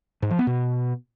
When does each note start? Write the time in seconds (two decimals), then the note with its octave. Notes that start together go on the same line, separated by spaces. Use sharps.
0.22 G#2
0.31 F3
0.39 B3
0.47 B2